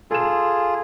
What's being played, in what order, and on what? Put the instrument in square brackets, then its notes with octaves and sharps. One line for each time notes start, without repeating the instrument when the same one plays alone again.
[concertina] F4 G#4 [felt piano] A4 E7